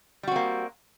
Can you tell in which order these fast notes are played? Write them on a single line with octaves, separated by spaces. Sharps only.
G3 F#4 C4 A#3